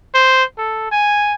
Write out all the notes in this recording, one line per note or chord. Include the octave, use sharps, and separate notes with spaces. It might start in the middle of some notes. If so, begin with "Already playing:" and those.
C5
A4
G#5